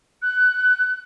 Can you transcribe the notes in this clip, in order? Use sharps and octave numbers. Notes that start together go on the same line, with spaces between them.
F#6